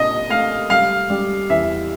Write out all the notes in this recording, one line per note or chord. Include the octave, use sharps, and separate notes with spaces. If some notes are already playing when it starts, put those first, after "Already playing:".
Already playing: A#2 D4 D#5
A3 F5
G3 F5
G3
E2 E5